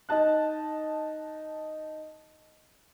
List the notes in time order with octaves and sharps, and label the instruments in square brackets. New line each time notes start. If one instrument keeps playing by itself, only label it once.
[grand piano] D#4 D#5 A5 F#6